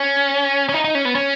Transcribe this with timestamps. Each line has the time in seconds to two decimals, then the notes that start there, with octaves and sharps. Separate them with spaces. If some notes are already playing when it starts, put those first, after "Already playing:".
Already playing: C#4
0.69 C#4
0.74 D#4
0.84 D#4
0.95 C#4
1.05 B3
1.15 C#4